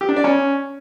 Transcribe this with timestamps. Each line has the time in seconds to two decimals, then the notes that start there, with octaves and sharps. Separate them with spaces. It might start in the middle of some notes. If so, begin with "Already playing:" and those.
0.01 G4
0.09 D4
0.16 D5
0.24 C#4